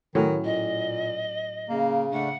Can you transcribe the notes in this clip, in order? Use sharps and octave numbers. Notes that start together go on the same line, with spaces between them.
A2 D#3 F#3 C#4
A#2 D#5
C#3 A#3
C#3 A3 D4 F#5